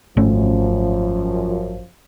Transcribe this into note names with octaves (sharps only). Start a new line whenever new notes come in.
G#1 F#2 F3 A3 C#4